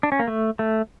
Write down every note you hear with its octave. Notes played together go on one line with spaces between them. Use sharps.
D4
C#4
A#3
A3
A3